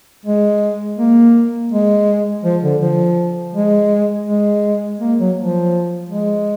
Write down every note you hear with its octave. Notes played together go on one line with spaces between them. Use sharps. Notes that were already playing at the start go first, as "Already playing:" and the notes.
G#3
A#3
G#3
F3
D3
F3
G#3
G#3
A#3
F#3
F3
G#3